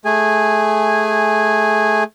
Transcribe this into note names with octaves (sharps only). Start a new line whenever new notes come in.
A3 G#4 G#5